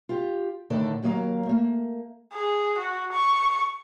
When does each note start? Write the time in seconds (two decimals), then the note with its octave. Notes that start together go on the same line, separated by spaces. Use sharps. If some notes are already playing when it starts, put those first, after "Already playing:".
0.09 F4 G4
0.70 A2 D3 D#3 A4 D5
1.02 D#2 F#3 A#3 D#5 F5 A#5
1.46 A3 A#3
2.33 G#4
2.78 F#4
3.12 C#6